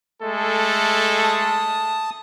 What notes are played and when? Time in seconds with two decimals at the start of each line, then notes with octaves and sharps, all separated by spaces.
0.22 G#3 A3 A4
1.23 A5 D#6